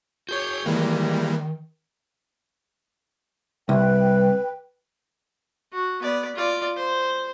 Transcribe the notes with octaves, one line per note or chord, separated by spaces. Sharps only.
F#4 G#4 C#5 G6
D#3 E3 G3 G#3 A#3
C2 B4 G5
F#4
B3 D5
F4 D5
C5